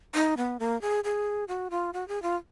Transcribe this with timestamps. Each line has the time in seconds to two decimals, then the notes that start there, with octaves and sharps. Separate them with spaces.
0.14 D#4
0.37 B3
0.60 A#3
0.81 G#4
1.04 G#4
1.48 F#4
1.71 F4
1.93 F#4
2.08 G#4
2.23 F4